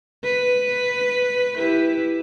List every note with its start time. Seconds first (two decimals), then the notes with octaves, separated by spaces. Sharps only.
0.24 B4
1.57 E4 G4 B4